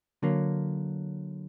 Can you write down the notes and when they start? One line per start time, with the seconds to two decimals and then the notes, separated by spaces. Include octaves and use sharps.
0.23 D3 F#3 A#3